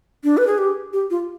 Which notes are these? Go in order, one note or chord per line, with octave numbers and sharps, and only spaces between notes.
D4
B4
G#4
G4
G4
F4